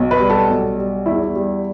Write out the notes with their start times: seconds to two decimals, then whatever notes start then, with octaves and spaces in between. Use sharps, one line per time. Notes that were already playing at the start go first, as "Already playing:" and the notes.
Already playing: B1
0.11 B4
0.20 G3
0.30 A4
0.49 B1
0.78 G3
1.06 E2 E4
1.36 G3